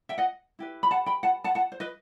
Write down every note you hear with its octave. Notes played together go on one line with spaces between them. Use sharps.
E5 G5
D#5 F#5
E4 G4 B4
B5
F#5 A5
G5 B5
F#5 A5
F#5 A5
F#5 A5
C5
B4 D#5